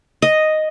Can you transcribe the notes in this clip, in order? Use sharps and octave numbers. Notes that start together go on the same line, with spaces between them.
D#5